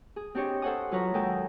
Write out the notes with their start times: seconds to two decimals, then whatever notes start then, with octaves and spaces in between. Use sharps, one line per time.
0.16 G#4
0.35 C4 D4 G4 C#5 D#5 G5
0.62 A4 C5 C#5 F#5 G#5 D#6
0.91 F#3 F4 B4 C#5 A#5
1.14 D#2 F#3 G#3 A4 G5 G#5